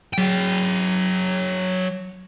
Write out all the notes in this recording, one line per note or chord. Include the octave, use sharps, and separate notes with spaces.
F#3 G5